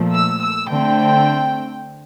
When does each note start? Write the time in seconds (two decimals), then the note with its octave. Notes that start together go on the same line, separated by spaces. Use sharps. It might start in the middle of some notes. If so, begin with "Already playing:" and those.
Already playing: A#2 F3 A3
0.12 E6
0.40 E6
0.68 D3 A3 C4 G5